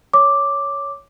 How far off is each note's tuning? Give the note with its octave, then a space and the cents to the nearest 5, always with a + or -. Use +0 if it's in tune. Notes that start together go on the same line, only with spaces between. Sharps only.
C#5 +5 D6 +0